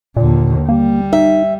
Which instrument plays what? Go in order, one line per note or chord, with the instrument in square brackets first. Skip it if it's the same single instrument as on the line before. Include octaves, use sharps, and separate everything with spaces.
[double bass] D#2 D3 [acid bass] A#2
[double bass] G3 [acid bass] A#3
[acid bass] D#4 [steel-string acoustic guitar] E5